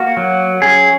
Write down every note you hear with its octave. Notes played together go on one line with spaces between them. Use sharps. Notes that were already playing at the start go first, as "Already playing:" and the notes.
Already playing: A#3 F#4
F#3
C#4 G#4